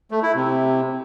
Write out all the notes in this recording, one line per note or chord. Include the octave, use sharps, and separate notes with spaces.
A3
E4
C3